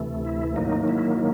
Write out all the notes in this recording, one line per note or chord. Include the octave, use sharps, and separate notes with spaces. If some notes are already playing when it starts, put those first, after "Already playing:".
Already playing: D2 C3 E3 A3
E4
G#2 D#3 F#3 A#3 D#4
E4